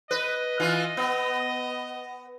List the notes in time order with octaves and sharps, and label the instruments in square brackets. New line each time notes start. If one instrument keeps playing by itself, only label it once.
[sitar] B4 [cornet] D#5
[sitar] E3 F4
B3